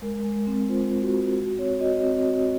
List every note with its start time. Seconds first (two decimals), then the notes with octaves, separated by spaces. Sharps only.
0.02 G#3 A#4
0.24 G#3
0.47 C4
0.69 F4 C5
0.91 G#3
1.02 F#4
1.13 G#3
1.37 F#4
1.58 C4 C#5
1.81 F#4 D#5
2.03 C4
2.26 F#4